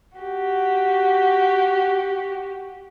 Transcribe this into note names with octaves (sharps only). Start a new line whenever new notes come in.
F#4 G4